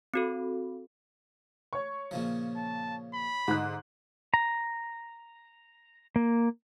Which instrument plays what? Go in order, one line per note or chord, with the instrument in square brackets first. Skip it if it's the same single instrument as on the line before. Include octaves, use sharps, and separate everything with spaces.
[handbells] C4 F#4 A4
[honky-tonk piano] C#5 C#6
[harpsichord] A#2 C#3 F3
[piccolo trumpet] A5
B5
[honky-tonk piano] G#2 D#4 F#6 [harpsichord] D3
[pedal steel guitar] A#5
A#3